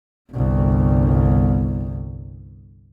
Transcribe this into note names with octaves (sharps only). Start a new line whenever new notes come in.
G1 C2